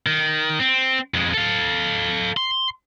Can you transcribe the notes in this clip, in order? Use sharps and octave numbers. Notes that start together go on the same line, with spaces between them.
D#3
C4
F2 G#3
A4 F5
C6